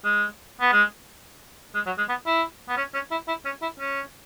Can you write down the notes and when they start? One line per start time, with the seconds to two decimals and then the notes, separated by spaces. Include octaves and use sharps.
0.04 G#3
0.61 B3
0.72 G#3
1.75 G#3
1.86 F#3
1.98 G#3
2.09 B3
2.26 E4
2.69 B3
2.77 C#4
2.94 C#4
3.11 E4
3.28 E4
3.45 C#4
3.62 E4
3.80 C#4